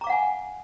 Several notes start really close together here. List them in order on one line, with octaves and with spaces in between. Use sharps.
A#5 D6 F5 F#5 G#5